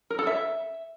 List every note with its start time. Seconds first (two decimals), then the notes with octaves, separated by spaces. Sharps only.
0.10 A#4
0.19 A4
0.27 E5